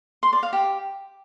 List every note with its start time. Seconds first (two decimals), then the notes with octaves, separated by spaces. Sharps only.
0.23 C6
0.33 D5
0.43 F5
0.53 G4